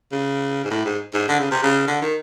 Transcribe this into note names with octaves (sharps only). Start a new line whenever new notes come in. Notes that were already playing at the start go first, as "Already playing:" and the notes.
C#3
G#2
A2
G#2
G#2
D3
C#3
C3
C#3
D3
D#3